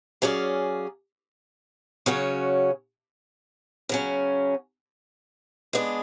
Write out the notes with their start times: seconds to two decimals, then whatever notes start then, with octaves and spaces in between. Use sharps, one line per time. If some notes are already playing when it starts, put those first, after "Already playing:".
0.22 F#3 C#4 G#4 D5 F5
2.06 C#3 F#3 C#4 F#4 C#5
3.89 C#3 F#3 C#4
5.73 G#3 B3 D4 G#4